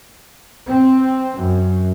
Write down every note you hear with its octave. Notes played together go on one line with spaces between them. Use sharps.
C4
F#2